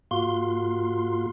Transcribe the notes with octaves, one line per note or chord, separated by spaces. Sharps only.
G#2 A#3 F4 F#4 C6